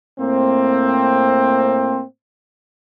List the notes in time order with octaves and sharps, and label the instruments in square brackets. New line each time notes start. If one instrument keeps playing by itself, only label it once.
[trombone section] A2 A#3 C4